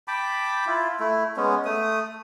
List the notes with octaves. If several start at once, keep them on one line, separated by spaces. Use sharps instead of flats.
G5 A5 B5 D6
E4 F4
A3 E4
G#3 B3 C#4
A3 D#6